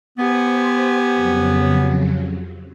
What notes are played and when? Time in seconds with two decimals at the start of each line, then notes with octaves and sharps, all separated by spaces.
0.18 B3 G4 C5 G#5
1.14 F2 C#3 F#3